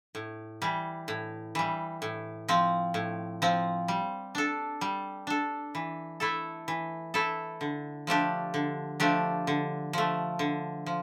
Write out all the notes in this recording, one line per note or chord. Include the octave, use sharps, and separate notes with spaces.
A2
E3 G3
A2
E3 G3
A2
F3 C4
A2
F3 C4
G3
D4 A4
G3
D4 A4
E3
A3 E4 A4
E3
A3 E4 A4
D3
F3 A3 D4 G4
D3
F3 A3 D4 G4
D3
F3 A3
D3
F3